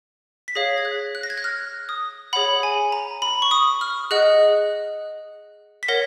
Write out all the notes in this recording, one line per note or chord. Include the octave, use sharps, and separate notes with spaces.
B6
G#4 C#5 F5 A#6
G#6
F#6
F#6
A#6
G#6
F#6
F6
D#6
G#4 C#5 F#5 B5
G#5
A#5
B5
C#6
D#6
F6
G#4 D#5 F#5 F#6
B6
A#4 C#5 F#5 A#6